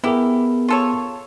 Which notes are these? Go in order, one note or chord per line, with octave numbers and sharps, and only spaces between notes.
B3 E4 G4 G#4 A#4
F4 A4 C#5